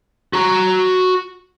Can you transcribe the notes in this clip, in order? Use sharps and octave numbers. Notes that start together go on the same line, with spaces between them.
F#4 A#5